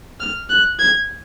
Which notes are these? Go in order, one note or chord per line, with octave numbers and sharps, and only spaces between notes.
F6
F#6
G#6